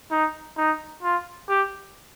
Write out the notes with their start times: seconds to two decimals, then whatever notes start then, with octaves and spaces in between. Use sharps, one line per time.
0.11 D#4
0.57 D#4
1.02 F4
1.49 G4